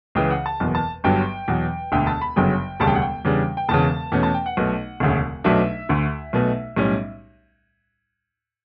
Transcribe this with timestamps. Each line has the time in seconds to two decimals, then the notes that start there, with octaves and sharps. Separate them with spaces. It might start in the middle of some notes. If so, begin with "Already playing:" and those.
0.15 C#2 C#3 E3 G5
0.30 F#5
0.46 A5
0.60 F#1 E2 B2
0.75 A5
1.04 G1 G2 F#3 G5
1.48 E2 B2 F#3
1.92 E1 D2 D3 G5
2.07 A5
2.22 B5
2.36 G1 F#2 C#3 F#3 G5
2.80 E1 D2 C#3 G3 A5
2.87 G5
2.95 F#5
3.02 G5
3.25 E2 C#3 G3 D4
3.57 G5
3.69 E1 E2 C#3 A5
4.12 E2 B2 A3 C#4
4.23 A5
4.34 G5
4.46 F#5
4.57 B1 B2 A3
5.00 E1 D2 C#3
5.44 B1 B2 F#3 A3 D4 E5
5.89 D2 D3 A3
6.33 B1 B2 A3
6.76 B1 A2 G3 C#4